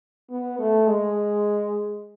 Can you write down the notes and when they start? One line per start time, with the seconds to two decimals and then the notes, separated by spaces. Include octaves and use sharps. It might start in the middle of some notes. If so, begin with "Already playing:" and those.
0.30 B3
0.59 A3
0.87 G#3